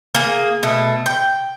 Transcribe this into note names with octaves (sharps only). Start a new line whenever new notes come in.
A#3 G#4
B2 A3
G5